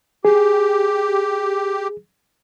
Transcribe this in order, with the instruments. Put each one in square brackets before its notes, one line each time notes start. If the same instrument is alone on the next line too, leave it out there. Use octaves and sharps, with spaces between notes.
[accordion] G4 [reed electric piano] G#4